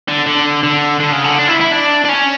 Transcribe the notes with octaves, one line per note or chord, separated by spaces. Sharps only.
D3
D3
D3
D3
C#3
D3
D4
E4
E4
D4
D4
C#4